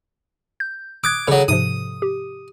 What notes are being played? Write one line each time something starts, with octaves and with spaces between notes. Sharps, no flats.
G6
D6 D#6 F#6 G#6
C#3 F#3 A4
G#2 C3 F3 D#6
G4